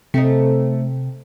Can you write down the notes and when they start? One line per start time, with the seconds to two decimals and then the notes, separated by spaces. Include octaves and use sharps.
0.14 C3 A3 C4 D#4